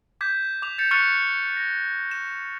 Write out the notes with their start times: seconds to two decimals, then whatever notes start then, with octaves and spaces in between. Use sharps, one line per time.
0.21 D6 G6 G#6 B6
0.62 D6 F7
0.78 G6 A6 C#7
0.91 C#6 F6 F#6 A6 C#7 F7
1.57 A#6
2.11 E7